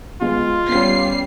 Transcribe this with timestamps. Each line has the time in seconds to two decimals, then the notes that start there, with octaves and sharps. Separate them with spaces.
0.21 G#3 B3 F4
0.69 G3 B3 C#4 C7